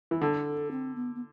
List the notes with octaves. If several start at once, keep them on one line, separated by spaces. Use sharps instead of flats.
E3
D3 A4
C4
B3
B3